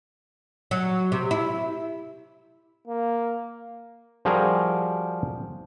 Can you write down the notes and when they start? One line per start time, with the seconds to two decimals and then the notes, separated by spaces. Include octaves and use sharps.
0.71 F#3
1.12 C3
1.31 E4
2.87 A#3
4.25 F3 G3 F#4 G#4 A#4